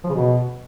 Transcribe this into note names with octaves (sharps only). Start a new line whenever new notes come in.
F3
C#3
B2